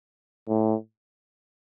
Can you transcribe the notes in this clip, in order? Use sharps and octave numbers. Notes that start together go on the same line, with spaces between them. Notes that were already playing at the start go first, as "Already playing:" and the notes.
A2